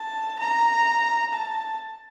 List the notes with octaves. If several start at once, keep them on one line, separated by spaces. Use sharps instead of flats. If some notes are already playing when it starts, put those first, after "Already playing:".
Already playing: A5
A#5
A5